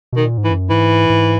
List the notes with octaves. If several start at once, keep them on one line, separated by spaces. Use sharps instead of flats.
B2 D#3
A#2
G#2
E3
F#2
G#2 E3
G#2